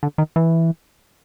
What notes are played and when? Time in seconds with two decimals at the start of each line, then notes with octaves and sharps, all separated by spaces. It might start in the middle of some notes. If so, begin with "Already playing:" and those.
0.03 D3
0.18 D#3
0.36 E3